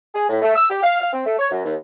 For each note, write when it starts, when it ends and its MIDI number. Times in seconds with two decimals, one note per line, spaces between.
0.15 0.25 68
0.29 0.41 45
0.42 0.54 57
0.56 0.68 88
0.70 0.82 67
0.83 1.00 77
1.00 1.08 77
1.13 1.25 60
1.25 1.37 57
1.39 1.48 73
1.51 1.59 42
1.64 1.75 39